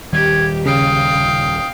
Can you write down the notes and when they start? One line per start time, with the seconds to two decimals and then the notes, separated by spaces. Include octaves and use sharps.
0.13 D#1 D#3 G3 G4 G#6
0.66 C#3 F5 G5 D#6